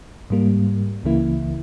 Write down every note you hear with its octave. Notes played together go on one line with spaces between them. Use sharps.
G#2 G3 A#3
C#2 C#3 E3 A#3 E4